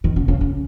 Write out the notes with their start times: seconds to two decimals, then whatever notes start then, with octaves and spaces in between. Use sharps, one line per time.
0.04 D#3
0.16 C#3
0.28 C#3
0.41 C#3